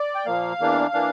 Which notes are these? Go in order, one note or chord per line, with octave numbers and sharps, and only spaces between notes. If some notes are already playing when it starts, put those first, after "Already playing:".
Already playing: D5
G5
A#2 F3 A#3 F5
E2 E3 A#3 D4
E3 A#3 D4